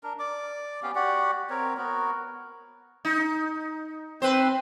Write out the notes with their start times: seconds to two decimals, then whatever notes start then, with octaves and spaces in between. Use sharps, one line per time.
0.03 D4 A#4
0.19 D5 D6
0.83 B3 C#4 G4 F5
0.95 F#4 G4 D5 F#5
1.50 C4 A#4 C#5
1.77 B3 F#4 A#4
3.05 D#4
4.22 C4 B4 C5